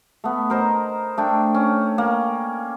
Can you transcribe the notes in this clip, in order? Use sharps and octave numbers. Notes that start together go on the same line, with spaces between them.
A3 B3
A#4 C5 D#5
A3 D4 G5
C#4
A#3